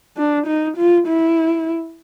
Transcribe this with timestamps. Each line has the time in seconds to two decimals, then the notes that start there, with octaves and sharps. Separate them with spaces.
0.17 D4
0.47 D#4
0.77 F4
1.07 E4